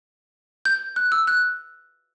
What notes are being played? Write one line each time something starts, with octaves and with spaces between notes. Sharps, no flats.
G6
F#6
E6
F#6